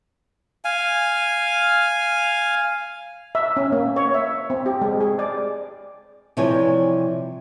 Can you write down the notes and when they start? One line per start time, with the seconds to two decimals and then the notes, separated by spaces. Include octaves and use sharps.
0.65 F5 G#5
3.35 E5
3.57 C#4
3.72 A#3
3.96 C#5
4.14 E5
4.50 C4
4.66 G4
4.82 G#3
5.01 G#4
5.19 D5
6.37 C3 E3 F3 G3 C#5 G#5